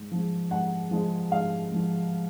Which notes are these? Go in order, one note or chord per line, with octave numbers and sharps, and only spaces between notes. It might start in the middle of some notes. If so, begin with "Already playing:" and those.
Already playing: G#2
F3 G#3
G#2 F#5
F3 G#3
G#2 F5
F3 G#3